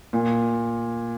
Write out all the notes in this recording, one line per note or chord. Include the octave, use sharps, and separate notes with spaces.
A#2